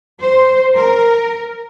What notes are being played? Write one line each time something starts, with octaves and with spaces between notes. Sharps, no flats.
C5
A#4